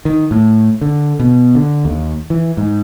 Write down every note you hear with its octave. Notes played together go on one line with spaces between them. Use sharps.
D#3
A2
D3
B2
D3
D#2
E3
G#2